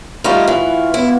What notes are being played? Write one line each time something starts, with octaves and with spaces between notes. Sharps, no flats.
G3 A3 D#4 F4 F#4 B5
E3
B3 E4